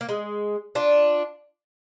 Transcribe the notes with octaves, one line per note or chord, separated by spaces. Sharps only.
A#3
G#3
D4 F4